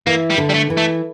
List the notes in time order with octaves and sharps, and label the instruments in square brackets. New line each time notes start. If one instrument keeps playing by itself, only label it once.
[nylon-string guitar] E3 [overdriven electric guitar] A#3
[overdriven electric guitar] G3
[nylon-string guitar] D3
[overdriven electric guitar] G3
A3
[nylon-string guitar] E3
[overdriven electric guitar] A3